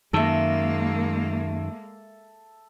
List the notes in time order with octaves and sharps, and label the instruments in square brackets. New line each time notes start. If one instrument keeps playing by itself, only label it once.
[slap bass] F#2 D#3 [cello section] G#3 A#3 [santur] A4 E5